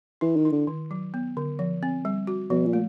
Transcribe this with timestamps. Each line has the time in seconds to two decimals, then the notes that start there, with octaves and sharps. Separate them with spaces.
0.21 E3 E4
0.37 D#3
0.45 E4
0.52 D3
0.67 D#3
0.91 F#3
1.14 B3
1.37 D3
1.59 F3
1.83 C4
2.05 G3
2.27 F#4
2.50 B2 F3
2.66 A#2
2.73 A3